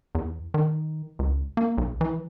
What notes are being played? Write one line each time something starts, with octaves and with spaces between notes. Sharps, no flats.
E2
D#3
C#2
A#3
B1
E3